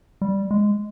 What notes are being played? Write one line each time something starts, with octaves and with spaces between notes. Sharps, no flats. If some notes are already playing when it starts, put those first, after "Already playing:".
G3
G#3